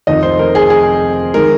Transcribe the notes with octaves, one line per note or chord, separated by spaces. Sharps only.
F1 F2 D#3 D#5
C5
A#4
G#4
G#4
D#3 G#3 A#4